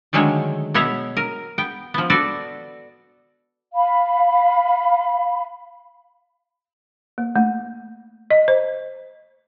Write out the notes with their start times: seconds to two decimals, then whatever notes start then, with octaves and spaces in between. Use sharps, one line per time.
0.13 D3 D#3 F#3 G#3 A3 C#5
0.74 B2 B3 C#5 E5 F#5
1.17 A#4
1.58 B3 G5
1.94 F3 B3
2.10 F#4 A4 B4 D5
3.75 F5 B5
7.18 A#3
7.36 A3
8.31 D#5
8.48 C5